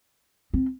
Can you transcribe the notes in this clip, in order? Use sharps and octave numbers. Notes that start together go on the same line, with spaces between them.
C4